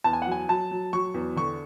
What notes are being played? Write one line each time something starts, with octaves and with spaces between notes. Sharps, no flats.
E2 A5
G#5
F#5
F#3
G#5
F#3 A5
F#3
F#3 C#6
E2
D3 C#6